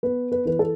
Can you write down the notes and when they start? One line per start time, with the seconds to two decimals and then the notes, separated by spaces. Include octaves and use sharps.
0.03 B3 B4
0.32 B4
0.45 E3 B4
0.59 A4